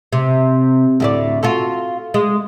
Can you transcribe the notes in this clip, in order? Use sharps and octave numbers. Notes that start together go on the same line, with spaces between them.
C3
D2 A2 D5
F4 F#4 A4
G#3